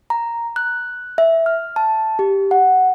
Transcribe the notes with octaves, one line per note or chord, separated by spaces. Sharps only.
A#5
F#6
E5
F6
A5
G4
F#5